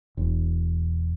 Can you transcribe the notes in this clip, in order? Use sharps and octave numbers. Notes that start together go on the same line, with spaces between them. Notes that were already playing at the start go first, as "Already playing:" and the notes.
E1